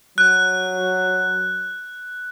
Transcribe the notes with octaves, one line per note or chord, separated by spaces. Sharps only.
F#3 F#6